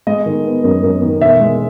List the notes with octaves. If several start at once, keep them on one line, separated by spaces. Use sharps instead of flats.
G#3 D#5
D#3
B3
F#2
F#2
D#3
E1 E5
G#3